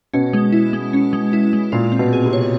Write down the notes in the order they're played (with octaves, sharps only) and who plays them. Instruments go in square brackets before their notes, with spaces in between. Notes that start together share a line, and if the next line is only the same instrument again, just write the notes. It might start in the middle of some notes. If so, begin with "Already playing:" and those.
[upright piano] B2 [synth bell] C#4
[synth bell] G#3
E4
G#3
C#4
G#3
E4
G#3
[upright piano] A#2 [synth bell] F4
[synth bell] C4
[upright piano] B2
[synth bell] G#4
[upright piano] C3
[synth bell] C#5